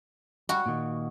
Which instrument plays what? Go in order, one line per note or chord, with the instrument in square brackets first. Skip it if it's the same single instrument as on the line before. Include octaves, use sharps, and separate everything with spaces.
[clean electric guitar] G3 [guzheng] F#4
[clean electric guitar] A#2 D#3